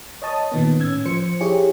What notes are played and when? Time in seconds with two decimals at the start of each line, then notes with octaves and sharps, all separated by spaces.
0.22 C#5 D#5 A5 D#6
0.52 A#2 D#3 B3
0.79 A2 C#4 E6 G#6
1.05 F3 C5 C#7
1.41 E4 G4 G#4 C#5